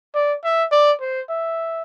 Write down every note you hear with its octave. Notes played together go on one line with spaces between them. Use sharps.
D5
E5
D5
C5
E5